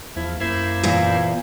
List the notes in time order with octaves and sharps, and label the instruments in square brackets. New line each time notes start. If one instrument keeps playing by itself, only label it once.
[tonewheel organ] E2 F3 [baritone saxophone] E4
[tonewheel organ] F#2 A#3 C5 [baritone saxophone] E4
[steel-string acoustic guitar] E2 A#2